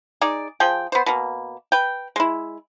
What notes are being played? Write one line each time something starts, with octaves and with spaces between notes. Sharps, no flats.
D#4 G#4 D5
F3 G#4 G5
B3 C5
B2 A#3
B4 G5
G#3 E4